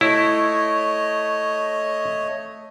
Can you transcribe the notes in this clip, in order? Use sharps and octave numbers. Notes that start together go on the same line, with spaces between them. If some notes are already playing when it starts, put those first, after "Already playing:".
A3 E4 C#5 D#5